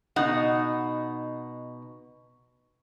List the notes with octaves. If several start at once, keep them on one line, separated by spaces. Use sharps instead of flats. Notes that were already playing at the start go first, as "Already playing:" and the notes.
B2 D#4 F#5